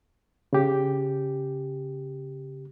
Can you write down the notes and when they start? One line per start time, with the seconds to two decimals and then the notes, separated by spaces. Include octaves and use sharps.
0.53 C#3 G4